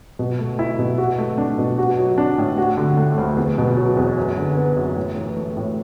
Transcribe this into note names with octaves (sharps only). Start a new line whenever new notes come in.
B2
A3
E4
B2
F#4
A3
D4
B2
F#4
F#3
D4
A2
F#4
D3
A3
D2
E2
B2
F#3
E2
F#2
D3
B3
F#2
A2
E3
A3
A2